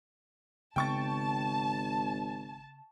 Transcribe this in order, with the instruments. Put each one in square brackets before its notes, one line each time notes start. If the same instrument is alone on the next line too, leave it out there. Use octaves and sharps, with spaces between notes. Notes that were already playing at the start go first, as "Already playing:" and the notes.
[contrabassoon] G#1 [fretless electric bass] C#3 B3 [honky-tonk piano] G5 C#6 A6 [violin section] A5